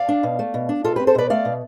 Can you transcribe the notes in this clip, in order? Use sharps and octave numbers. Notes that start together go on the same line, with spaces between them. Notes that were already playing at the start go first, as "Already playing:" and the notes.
Already playing: D5 F5
D4
B2
A3
B2
D4
B2 F4 A4
C4 G4 B4
A4 C5
B2 B4 D5
A3 D5 F5
B2